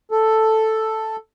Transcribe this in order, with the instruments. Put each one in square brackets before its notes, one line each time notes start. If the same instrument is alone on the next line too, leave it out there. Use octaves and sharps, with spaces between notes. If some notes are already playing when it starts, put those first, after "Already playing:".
[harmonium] A4